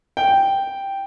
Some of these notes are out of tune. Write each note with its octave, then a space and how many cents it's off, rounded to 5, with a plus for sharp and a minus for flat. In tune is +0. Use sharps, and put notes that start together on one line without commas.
G5 +0